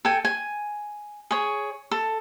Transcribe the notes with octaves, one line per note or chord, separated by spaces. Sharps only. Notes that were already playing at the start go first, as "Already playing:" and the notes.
A4 G5 G#5
G#5
G#4 C#5
A4